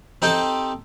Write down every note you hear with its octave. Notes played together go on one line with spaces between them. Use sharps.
C4 D#4 G4 A4